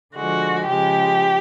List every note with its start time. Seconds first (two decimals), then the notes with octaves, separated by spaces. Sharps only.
0.15 D3 F3 G#3 F#4
0.68 C#3 F3 G#3 G4